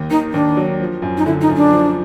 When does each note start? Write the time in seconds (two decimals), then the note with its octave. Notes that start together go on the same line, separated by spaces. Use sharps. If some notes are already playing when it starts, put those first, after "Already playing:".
Already playing: D#2
0.11 D#3 D#4
0.33 D#2 D4
0.57 F#3
0.80 F3
1.02 F#2
1.18 D#4
1.26 D3 E4
1.41 D#4
1.49 F#2
1.56 D4
1.72 F3